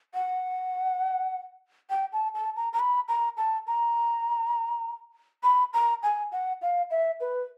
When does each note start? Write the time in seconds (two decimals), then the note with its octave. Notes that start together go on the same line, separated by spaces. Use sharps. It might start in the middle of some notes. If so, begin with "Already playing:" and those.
0.14 F#5
1.90 G5
2.13 A5
2.35 A5
2.56 A#5
2.73 A#5
2.80 B5
3.08 A#5
3.37 A5
3.67 A#5
5.43 B5
5.73 A#5
6.03 G#5
6.32 F#5
6.62 F5
6.91 E5
7.21 B4